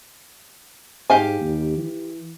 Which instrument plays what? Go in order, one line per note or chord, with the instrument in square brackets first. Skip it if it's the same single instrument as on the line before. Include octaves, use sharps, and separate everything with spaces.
[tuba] G#2 [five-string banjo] G4 F5 G#5
[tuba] D#2
E3